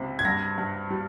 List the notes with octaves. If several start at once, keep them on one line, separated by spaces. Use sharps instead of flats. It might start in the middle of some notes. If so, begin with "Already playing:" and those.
Already playing: C#2 C3
G#6
G2 A#6
G2
G3